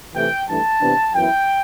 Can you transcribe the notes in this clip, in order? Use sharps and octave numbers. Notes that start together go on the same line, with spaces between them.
C3 E3 A3 E4 G5
G2 E3 A3 D4 A5
C3 E3 B3 D4
F#2 E3 B3 E4 G5